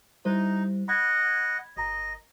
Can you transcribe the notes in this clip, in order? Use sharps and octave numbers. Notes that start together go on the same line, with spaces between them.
G3 D#4 E4 C5
D#5 F#5 B5 G#6
G1 D#5 A#5